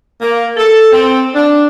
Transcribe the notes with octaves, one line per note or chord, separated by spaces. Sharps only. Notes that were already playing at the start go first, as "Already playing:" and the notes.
A#3
A4
C4
D4